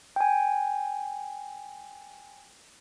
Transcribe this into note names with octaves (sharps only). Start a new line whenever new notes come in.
G5 G#5